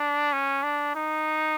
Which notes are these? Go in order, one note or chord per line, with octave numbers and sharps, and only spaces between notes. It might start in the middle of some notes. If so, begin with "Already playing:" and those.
Already playing: D4
C#4
D4
D#4